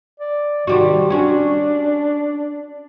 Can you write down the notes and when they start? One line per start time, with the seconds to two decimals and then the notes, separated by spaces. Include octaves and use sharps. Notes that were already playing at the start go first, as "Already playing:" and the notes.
0.20 D5
0.67 C3 D#3 G3 F#4
1.10 C#4 D4 F#4